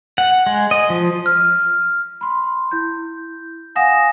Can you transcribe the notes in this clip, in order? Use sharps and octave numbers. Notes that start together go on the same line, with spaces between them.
F#5
G#3
D#5
F3
F6
B5 C6
E4 G6
F5 F#5 G#5 D#6 A#6 E7